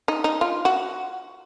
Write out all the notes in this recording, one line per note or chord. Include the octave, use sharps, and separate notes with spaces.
D#4
D#4
F4
F#4